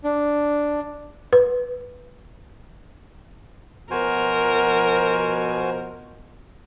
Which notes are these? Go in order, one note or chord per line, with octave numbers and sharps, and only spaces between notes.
D4
B4
B2 F3 F#4 A#4 C5 G#5